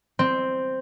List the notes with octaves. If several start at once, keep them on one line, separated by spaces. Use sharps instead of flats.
C4